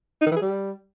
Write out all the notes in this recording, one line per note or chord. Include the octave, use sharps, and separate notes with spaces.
D#4
D#3
E3
G#4
G3